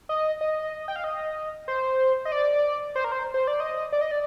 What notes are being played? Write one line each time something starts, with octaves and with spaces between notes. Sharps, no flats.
D#5
D#5
G5
F5
D#5
C5
D#5
D5
C5
A#4
C5
C5
D5
D#5
D5
D#5
D5